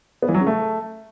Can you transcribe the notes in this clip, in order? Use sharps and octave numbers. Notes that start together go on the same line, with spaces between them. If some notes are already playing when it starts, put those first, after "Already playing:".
B3
E3
F#3
C#3
A3